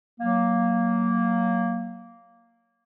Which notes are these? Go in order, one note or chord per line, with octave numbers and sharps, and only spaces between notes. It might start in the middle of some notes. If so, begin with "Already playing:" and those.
F#3 A#3